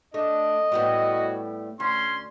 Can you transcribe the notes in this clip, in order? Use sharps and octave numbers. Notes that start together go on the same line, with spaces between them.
A3 D4 D#5
A2 G3 B3 F#4 C#5
D2 C#4 C6